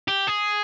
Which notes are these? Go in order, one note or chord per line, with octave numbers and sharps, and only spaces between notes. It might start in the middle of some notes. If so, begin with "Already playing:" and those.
G4
G#4